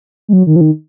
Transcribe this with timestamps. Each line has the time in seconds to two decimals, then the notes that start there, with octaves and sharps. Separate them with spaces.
0.28 G#3
0.33 F#3
0.47 D#3
0.56 F3
0.61 D#3